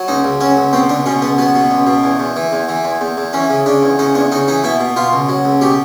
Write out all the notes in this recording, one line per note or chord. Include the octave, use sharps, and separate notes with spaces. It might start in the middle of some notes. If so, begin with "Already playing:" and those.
Already playing: F#3
C#2 D#4
C#2
F#3 C#4
C#2
B2 C4
C#2 D4
B2 C#4
C#2 B3
F#3 B3
B2
C#2
B2
E2
E2
E3
E2
E3
E2
E2
E2
E3 C#4
C#3
C#3 D4
E2
C#3 D#4
E2 D4
C#3 D#4
E3 D#4
B2 E4
B2
B2 F4
C#2
F#3
C#2
B2 G4